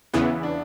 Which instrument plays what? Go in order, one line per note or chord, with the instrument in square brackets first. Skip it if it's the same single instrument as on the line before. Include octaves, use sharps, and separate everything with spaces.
[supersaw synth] E2 C#3 E3 B3 [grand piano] E4
[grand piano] D4